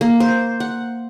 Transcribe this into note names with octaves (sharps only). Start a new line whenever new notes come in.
A#3
C5
F#5